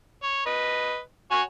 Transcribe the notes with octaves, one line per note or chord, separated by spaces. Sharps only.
C#5
B4 D#5
F#4 C#5 G#5